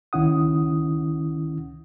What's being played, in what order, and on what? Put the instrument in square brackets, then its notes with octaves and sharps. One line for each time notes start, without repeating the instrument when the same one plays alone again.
[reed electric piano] C#2 D#3 C#4 E4 F#5 D#6